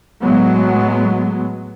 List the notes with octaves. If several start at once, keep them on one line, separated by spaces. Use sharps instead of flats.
A2 F#3 G#3 B3